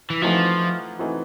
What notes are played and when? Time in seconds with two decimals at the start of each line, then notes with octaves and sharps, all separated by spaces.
0.10 E3
0.22 E3 F3 A3 C4 D#4 F#4
0.99 E3 A3 C4 D#4 F#4